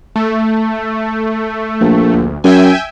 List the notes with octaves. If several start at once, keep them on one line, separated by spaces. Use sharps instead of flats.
A3
A#1
D2
F#2 E5 G5 G#5